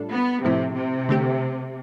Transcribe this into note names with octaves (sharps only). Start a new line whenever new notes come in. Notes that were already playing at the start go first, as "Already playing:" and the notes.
Already playing: A2 G3 D4 F4 A4
B3
A2 C3 F3 A3 C4 E4
C3
D3 A3 C4 G4